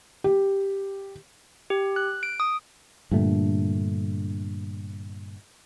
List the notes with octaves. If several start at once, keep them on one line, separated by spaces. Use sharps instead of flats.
G4
G4
F#6
D7
D#6
G2 A#2 D3 A3